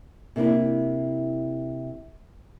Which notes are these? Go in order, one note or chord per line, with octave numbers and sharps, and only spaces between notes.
C3 A#3 D4 E4